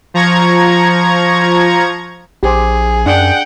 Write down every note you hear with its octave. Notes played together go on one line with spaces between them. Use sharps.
F3 A#5 C#6 G#6
A#1 G4 G#4 C5
F#2 D4 F#5 G5